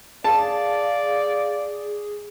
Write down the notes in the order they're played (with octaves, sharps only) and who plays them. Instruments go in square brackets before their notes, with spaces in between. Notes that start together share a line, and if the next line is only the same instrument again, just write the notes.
[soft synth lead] G#4 [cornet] D5 [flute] F5 [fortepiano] A5